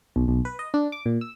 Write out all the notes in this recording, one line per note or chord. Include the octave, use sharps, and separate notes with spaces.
B1
B1
B4
D#5
D4
D6
A#2
E6